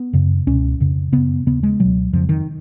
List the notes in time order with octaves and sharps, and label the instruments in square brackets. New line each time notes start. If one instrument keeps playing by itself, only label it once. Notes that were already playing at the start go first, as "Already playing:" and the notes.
Already playing: [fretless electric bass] B3
F#2 C#3
C#2 B2 C#4
F2 C#3
F#2 C#3 B3
D#2 C#3 B3
G#3
C#2 B2 F#3
F2 C#3 F3
D#3